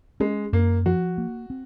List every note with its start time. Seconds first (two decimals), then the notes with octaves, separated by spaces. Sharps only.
0.20 G#3 C#4
0.53 F#2 A#3
0.86 F3 F#4
1.18 A#3
1.50 C4